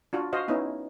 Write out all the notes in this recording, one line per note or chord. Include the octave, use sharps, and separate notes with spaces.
D4 F4 F#4
F#4 C5 D#5 F5
B3 C#4 D#4 E4